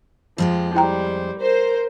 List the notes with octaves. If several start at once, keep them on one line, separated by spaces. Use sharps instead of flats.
F2 F3 G#3 G4
G3 E4 C5 G5 A#5
A#4 C5